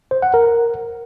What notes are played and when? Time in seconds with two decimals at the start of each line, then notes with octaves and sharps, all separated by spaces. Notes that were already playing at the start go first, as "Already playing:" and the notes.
0.11 C5
0.22 F#5
0.34 A#4